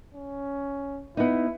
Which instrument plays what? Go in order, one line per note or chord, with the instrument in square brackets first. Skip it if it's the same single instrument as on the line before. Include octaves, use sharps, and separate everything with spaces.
[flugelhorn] C#4
[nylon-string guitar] B3 D#4 [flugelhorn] E4